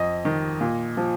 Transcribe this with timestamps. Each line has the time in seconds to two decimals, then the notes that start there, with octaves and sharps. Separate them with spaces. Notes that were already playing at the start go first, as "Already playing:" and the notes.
Already playing: F2 D#5
0.25 D#3
0.61 A#2
0.97 F3